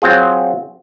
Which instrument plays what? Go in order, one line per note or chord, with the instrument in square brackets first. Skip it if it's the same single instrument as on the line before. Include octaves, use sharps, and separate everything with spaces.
[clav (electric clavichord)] F#3 C4 F4 G#4